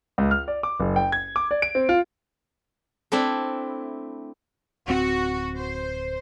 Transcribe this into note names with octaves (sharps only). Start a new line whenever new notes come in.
C#2
F6
D5
D6
F#1
G5
G#6
D6
D5
D7
C4
F4
A3 C4 D4 E4
D1 C4 F#4
C5